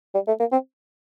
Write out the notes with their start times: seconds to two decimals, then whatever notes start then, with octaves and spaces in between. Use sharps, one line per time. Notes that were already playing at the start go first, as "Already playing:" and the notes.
0.14 G3
0.27 A3
0.40 A#3
0.52 C4